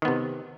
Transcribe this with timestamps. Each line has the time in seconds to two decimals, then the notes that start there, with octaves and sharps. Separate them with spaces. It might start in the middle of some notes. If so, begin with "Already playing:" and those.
0.02 D#3
0.05 B3
0.08 C3